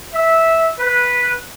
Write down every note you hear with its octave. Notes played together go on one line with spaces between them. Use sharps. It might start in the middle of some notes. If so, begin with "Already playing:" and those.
E5
B4